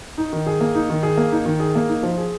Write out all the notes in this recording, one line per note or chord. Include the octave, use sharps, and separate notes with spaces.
D#4
D#3
G#4
A#3
D#4
D#3
G#4
A#3
D#4
D#3
G#4
A#3
D#4
F3
G#4